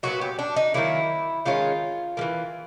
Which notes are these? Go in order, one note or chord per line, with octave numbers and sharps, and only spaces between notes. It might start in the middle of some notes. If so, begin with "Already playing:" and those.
A#2 F#3 B3 F#4
G4
D4
D#4
D#3 F#3 A#3 E4
D#3 G#3 C#4 F4
E3 G3 A#3